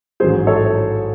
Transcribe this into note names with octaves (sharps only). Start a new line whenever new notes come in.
A1 G#2 F#3 G#4 C5
A4 C#5